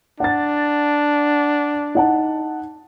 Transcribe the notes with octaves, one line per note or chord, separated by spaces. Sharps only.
D4 F#5 A6
D#4 F#5 A5